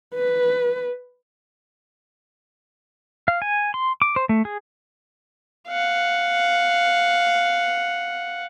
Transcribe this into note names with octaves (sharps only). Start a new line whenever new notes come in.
B4
F5
G#5
C6
D6
C5
A3
G#4
F5 F#5